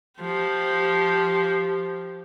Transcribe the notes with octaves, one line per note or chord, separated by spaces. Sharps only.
F3 G4